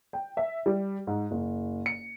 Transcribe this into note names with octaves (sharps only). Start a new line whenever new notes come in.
G5
E5
G3
G#2
F#1
C#7